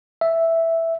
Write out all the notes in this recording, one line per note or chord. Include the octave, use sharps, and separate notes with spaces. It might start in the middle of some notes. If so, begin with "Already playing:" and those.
E5